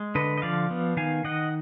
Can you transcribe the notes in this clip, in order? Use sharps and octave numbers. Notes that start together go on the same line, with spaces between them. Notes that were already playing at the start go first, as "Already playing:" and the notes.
Already playing: G#3
D3 B4 D#5
D#5
F3 D5 F5
B3
D#3 F5 G#5
D#3 D#5 F#5